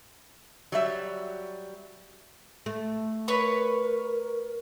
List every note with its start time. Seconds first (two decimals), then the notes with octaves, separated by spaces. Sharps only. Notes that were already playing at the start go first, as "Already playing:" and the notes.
0.72 F#3 G3 E5
2.66 A3
3.28 A#4 B4 C#5 C#6